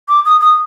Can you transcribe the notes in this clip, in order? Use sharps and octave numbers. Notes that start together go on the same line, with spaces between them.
D6
D#6
D#6